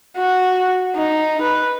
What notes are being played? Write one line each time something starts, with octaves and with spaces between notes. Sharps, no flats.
F#4
D#4
B4